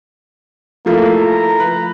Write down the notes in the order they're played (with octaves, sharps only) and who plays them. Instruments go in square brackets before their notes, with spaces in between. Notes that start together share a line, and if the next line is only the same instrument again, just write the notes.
[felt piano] F3 A3 E4 [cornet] A#3
[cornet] A#5
[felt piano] B4